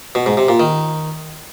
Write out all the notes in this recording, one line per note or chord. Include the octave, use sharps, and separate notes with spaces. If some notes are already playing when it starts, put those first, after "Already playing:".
B2
G#2
C3
A#2
D#3